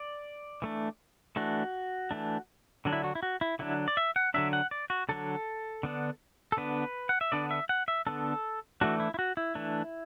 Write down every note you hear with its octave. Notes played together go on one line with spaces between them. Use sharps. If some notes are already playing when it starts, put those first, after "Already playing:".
Already playing: D5
E3 A3 D4
E3 A3 D4 F#4
E3 A3 D4
D3 F#3 D4
E4
F#4
E4
F#4
E4
D3 F#3 D4 E4
D5
E5
F#5
D3 F#3 D4 E5
F#5
D5
F#4
D3 F#3 D4 A4
D3 B3 D4
A4
D3 B3 D4 B4
F#5
E5
D3 B3 D4 D5
E5
F#5
E5
D3 B3 D4 A4
E3 A3 D4 F#4
E4
E4
F#4
E4
E3 A3 D4